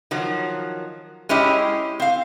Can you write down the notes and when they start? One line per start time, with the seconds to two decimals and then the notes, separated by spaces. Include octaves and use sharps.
0.11 D#3 F3 F#3
1.29 G#3 C#4 E4 G4 D#5
2.00 C4 F5